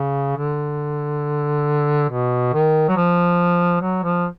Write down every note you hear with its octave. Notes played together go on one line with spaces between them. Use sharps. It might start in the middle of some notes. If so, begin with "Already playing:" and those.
Already playing: C#3
D3
B2
D#3
F#3
F3
F#3
F3